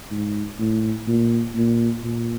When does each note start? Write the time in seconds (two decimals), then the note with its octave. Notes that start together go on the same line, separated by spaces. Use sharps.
0.11 G#2
0.59 A2
1.08 A#2
1.56 A#2
2.04 A#2